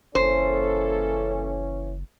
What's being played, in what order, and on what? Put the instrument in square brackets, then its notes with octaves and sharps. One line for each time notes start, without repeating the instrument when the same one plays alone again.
[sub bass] F#1 [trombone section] E3 C#4 [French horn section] G#3 A#3 A4 [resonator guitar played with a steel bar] C5